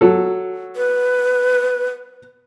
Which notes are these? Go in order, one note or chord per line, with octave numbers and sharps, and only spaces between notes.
F#3 A4
B4